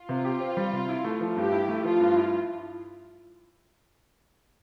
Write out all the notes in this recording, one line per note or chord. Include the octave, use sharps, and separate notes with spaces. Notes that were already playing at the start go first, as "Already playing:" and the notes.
Already playing: F4
C3
G4
C4
G3
C3
E4
A3
F3
G2 G4
E4
A3
F3 F4
G2
E4